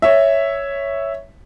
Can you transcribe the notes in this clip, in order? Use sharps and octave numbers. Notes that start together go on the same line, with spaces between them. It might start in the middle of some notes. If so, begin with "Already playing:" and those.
C#5 E5